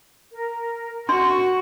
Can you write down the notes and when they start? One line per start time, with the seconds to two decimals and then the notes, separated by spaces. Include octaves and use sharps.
0.32 A#4
1.09 D4 F#4 C6 C#6